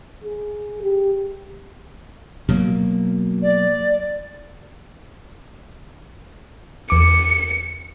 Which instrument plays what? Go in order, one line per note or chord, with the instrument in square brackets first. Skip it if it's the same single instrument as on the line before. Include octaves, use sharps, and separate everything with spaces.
[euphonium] G#4
G4
[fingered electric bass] B2 F#3 A#3
[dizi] D5
[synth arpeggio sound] E2 D6 [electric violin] C#7